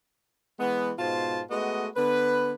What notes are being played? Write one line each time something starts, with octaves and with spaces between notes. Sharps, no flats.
E3 G#3 B3
G#2 B2 F4 C5 A5
G#3 A3 B3 F#4 D#5
D3 B3 B4